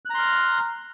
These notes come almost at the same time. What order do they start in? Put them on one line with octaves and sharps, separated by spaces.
F#6 A#5 C6 F6